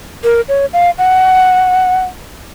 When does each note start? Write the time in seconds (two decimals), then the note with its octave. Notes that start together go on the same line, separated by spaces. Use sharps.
0.24 A#4
0.49 C#5
0.73 F5
0.98 F#5